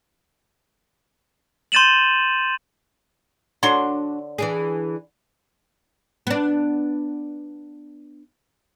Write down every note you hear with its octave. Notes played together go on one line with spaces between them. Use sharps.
C6 G6 A6 D#7 E7 F#7
D3 D4 F#4 C#5 C6
E3 D4 G#4
B3 D4